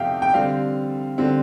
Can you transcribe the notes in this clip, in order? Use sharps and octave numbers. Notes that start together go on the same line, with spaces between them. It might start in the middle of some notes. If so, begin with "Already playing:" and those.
Already playing: F2 C3 F3 A3 E5 F5 G5
G5
D3 G3 C4 F5
D3 G3 C4